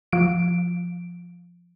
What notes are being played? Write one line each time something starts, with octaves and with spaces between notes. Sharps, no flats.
F3 D7